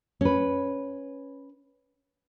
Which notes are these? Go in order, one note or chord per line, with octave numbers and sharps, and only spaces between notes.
C#4 B4